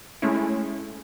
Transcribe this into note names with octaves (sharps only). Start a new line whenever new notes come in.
G#3 A3 C#4 E4